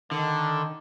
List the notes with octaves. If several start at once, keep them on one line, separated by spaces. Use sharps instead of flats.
D3 D#3